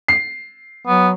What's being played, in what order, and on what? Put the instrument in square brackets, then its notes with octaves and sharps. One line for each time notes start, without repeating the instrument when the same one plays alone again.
[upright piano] C7
[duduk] F#3 [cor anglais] B3